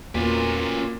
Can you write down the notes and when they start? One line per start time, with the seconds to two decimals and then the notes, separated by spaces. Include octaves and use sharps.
0.15 E2 A#2 C#4 F4 F#4 A#4 B4